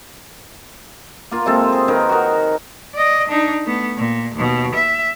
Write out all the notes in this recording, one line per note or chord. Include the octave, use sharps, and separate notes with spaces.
A#3 F4
C3 G#3 C4 A4
G#4
D#3 D#4 A#4 B4
F#4 A#4
D5 D#5
D4 D#4
A3 B3
A#2
D#2 B2
E5